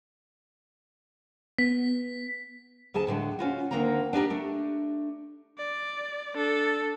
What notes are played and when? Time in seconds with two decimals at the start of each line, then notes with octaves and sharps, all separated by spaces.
1.58 B3 B6
2.94 D2 G#4 A4 A5
3.07 A2 D3 E3 G#3
3.39 C#4 F4 F#4
3.71 D2 D3 D#3 A#3 C4 A#5
4.13 D4 D#4 G4 A#4
4.30 A3 D4
5.58 D5
6.35 D4 A4